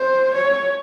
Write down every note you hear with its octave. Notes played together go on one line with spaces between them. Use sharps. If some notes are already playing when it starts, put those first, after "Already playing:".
Already playing: C5
C#5